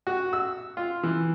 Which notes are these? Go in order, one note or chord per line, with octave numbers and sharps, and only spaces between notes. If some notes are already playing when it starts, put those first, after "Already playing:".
F#4
E6
F4
E3